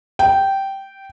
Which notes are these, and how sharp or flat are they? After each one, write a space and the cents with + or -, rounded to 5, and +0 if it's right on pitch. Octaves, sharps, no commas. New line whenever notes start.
G5 -10